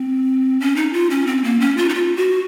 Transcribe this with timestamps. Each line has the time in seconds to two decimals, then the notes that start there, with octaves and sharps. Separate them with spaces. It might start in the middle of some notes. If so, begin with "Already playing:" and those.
Already playing: C4
0.60 C#4
0.76 D#4
0.93 F4
1.10 C#4
1.27 C4
1.44 A#3
1.60 C#4
1.77 F4
1.89 D#4
1.94 F4
2.17 F#4